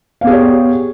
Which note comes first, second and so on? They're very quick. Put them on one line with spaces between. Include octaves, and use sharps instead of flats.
F5 B3 G#4 G4 C#5